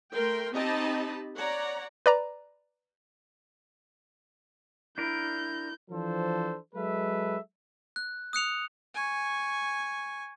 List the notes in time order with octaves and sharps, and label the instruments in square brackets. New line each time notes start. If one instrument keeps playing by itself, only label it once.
[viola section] A3 A#4 G5 C6
C4 D#4 G4 D#5 A5 B5
C#5 D5 F#5 A#5
[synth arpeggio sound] B4 D5 A#5
[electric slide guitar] D4 A#4 [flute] E4 [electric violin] G6
[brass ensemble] E3 F3 D4 A4 C5
F#3 G#3 A4 B4 E5
[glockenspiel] F#6
D#6 F#6 C#7 F7
[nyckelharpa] G#5 C#6